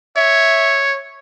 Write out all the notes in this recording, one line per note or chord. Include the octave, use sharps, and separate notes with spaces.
C#5 E5